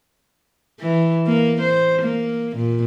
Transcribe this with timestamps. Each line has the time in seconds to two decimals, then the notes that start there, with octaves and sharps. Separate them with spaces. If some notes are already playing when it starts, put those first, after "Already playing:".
0.80 E3
1.27 A#3
1.61 C5
2.02 A#3
2.57 A#2